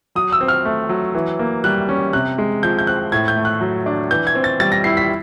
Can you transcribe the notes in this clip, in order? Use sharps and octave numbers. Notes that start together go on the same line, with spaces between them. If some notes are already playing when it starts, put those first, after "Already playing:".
F#3 D#6
E6
C4
F6
A3
F#3
E3
A#3
G3 F#6
C#4
C3 F#6
G#3
F3 G6
G6
C4 F#6
A2 G#6
G6
A3
F#6
F#3
D4
E3 G6
G#6
C4
A6
G3 A6
A#6
E4 C7
B6